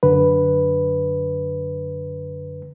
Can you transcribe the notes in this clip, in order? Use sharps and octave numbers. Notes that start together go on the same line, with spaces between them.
F#2 D3 B4